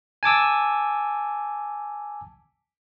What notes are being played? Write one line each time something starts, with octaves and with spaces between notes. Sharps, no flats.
G#5 A5 D6 E6